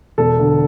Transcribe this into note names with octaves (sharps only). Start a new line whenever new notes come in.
E1 A4
D3